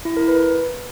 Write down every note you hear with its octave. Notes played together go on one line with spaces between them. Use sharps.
E4
A#4
B4